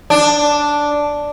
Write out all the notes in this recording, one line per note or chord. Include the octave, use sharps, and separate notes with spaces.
D4